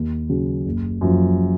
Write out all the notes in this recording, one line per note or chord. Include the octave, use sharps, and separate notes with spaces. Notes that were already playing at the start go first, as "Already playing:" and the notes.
Already playing: D#2
C#3 F#3
F#1
F#2 F3